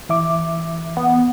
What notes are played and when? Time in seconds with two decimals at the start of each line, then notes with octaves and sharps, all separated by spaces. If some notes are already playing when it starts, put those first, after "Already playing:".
0.09 E3 E5 D6
0.97 B3